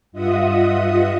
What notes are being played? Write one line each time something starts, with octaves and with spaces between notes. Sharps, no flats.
G2 F4 D#5 E5 F#5 D#6